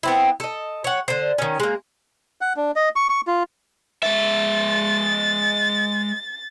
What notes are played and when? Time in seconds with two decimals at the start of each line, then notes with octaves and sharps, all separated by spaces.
0.03 B3 C4 E4
0.40 A4 D#5
0.84 C#5 F#5
1.08 D3 C5
1.38 D#3 C#4
1.60 G#3 A#3
2.41 F#5
2.56 D4
2.76 D#5
2.96 C#6
3.09 C#6
3.27 F4
4.03 G#3 E5 A6